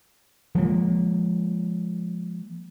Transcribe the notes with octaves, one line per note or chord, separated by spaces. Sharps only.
F3 G#3 A#3